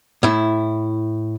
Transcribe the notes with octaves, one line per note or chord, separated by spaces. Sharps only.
A2 E4